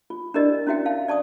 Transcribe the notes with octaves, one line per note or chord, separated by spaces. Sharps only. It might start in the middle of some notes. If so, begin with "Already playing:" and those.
F4
D4 E4 G4 A#4 D5 D#5
C#4 E4 F#4 E5 G5
F5 A5
D5 A5 C#6 D#6